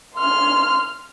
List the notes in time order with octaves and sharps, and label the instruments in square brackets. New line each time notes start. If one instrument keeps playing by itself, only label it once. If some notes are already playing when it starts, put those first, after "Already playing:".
[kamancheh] C6 F6